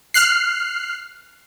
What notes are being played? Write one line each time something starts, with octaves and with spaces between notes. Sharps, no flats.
F6 F#6 C7